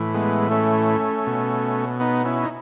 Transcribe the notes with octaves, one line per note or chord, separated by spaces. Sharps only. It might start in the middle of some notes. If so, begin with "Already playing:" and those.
Already playing: A2 E3
G#3 B3
A3 C#4
B2
B3 D#4
C#4 E4
D#4